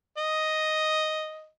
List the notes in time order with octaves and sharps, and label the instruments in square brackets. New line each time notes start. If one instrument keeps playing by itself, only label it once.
[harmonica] D#5